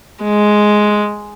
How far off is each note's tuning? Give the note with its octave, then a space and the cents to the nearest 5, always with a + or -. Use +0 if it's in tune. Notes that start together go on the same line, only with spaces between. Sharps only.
G#3 +5